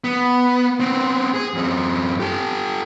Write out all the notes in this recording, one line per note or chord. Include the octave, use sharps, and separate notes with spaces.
B3
B3 C4
G#4
F#2 C4
G4 A4